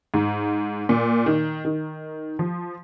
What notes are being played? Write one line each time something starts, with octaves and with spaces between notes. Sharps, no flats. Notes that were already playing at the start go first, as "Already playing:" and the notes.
G#2
A#2
D#3
D#3
F3